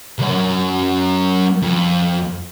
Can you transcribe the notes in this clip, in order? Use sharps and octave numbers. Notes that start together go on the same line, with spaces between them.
C2 F#2
F2